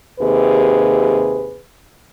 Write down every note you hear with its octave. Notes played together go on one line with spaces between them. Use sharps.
D#2 C3 G#4 B4